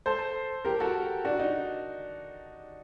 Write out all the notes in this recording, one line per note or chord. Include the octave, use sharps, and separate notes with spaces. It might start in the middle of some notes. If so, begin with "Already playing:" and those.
A4 C5
G4 A#4
F#4 A4
D4 F#4
D#4